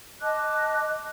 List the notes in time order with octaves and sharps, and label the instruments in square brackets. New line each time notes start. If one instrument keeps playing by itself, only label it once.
[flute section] D#5 A5 D6 F#6